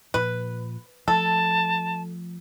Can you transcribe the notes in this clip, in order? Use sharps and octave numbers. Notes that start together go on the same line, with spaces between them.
A#2 F3 B4
F3 A3 A4 A5